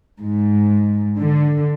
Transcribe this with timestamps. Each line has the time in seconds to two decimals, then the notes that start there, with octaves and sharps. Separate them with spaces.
0.20 G#2
1.18 D3